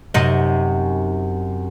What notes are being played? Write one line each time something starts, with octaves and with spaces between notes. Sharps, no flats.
F#2 C3 D#4